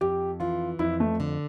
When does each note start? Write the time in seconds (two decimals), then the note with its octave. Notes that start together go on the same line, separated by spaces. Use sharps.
0.01 F2 G4
0.40 E3 F4
0.79 F2 E4
1.00 A3
1.20 D3